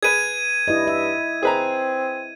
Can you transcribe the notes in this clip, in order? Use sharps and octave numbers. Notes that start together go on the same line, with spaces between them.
G#4 B4 G#6 D#7
G2 E4 D#5
E5
C4 G#4 B4 A#5